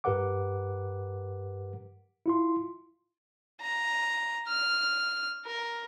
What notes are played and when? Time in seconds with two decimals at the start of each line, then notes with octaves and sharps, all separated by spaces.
0.04 G2 G4 A#4 B4 F#5 D6
2.26 E4 F4 C6
3.61 A#5
4.48 F6
5.46 A#4